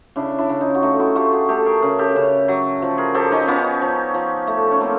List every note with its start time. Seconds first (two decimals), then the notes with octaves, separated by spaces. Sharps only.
0.16 C#3 D4 E4
0.38 D4 E4
0.50 C#3
0.61 D#4 F4
0.75 F#4
0.83 A3 D#4 F4
0.99 E4 F#4
1.16 A3 F4 G4
1.33 F#4 G#4
1.49 A3 G4 A4
1.65 G#4 A#4
1.82 C#3 G#4 A#4
1.99 G4 A4
2.16 C#3
2.48 F#3
2.82 F3
2.98 G#4 A#4
3.14 F3 G4 A4
3.31 C#4 D#4
3.48 F3 B3 C#4
3.82 F3
4.14 F3
4.47 A3
4.71 C#4
4.81 A3 A#3 C4